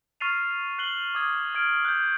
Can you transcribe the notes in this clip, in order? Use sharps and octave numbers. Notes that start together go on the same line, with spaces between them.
C#6 F6 A6 C7 D#7 F7
F#6 C7 F#7 G7
D6 D#6 G#6
F6 G#6 D7
F#6 G6